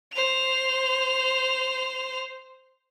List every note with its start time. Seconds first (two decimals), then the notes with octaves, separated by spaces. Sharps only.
0.13 C5 F7